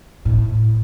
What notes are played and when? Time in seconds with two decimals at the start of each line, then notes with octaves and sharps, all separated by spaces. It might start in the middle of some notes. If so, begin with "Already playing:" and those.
0.25 A2